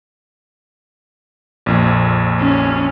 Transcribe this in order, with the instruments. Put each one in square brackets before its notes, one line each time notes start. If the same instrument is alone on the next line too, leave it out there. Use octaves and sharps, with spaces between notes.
[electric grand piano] A#1 F2 A#2
[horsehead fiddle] C#4